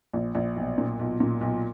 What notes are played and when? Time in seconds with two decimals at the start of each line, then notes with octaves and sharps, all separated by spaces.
0.13 A#1
0.35 A#1
0.56 B1
0.78 A#2
0.99 B1
1.20 A#2
1.41 B1